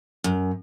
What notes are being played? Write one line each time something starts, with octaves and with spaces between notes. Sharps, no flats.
F#2